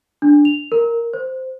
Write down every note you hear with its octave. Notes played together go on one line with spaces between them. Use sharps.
D4
F7
A#4
C5